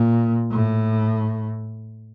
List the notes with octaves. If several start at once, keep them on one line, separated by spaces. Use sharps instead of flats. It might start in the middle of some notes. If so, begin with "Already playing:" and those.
Already playing: A#2
A2